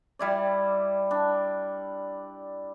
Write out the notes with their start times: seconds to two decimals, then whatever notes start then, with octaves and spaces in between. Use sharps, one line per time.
0.19 G3 E4 D5
1.11 D4